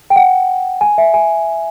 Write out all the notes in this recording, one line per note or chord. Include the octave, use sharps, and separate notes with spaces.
G5
F#5
G#5
E5
G#5